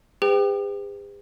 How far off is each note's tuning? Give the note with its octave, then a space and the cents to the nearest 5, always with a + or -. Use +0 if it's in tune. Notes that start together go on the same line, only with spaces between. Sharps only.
G#4 -45 B4 +45 G5 +0